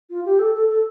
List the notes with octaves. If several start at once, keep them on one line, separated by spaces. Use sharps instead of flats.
F4
G4
A4
A4
A4